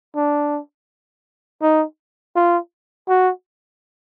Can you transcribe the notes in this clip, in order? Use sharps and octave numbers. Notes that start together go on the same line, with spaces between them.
D4
D#4
F4
F#4